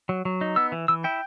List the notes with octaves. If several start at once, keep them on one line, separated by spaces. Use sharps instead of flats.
F#3
F#3
D#4
B3 E6
E3
E3 E6
E4 G5